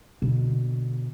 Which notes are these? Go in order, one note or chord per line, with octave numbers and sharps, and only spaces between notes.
B2 D3